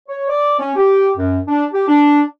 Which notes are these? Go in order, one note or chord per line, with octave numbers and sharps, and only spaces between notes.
C#5
D5
C#4
G4
F#2
D4
G4
D4